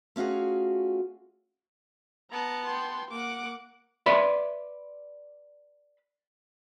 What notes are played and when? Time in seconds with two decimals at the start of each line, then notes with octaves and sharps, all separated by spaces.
0.16 A3 C#4 F4 F#4 G#4
2.31 B3 A5 A#5
2.65 G5 C6
3.11 A#3 F#5 D6
4.06 B4 D5 E5 B5 C6